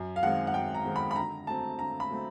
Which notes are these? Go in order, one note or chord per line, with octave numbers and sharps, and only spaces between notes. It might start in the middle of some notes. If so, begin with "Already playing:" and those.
Already playing: F#2
F5
D#3 G#3 C4 F#5
F#5
F#2 G5
A#5
D#3 G#3 C4
B5
B5
D3 A#5
F#3 A3 C4 A5
D3 A#5
B5
F#3 A3 C4